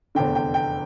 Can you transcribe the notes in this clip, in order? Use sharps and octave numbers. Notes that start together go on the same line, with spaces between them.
F1 E2 D3 G5
G5
G5